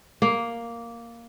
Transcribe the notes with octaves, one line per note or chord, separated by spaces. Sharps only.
A#3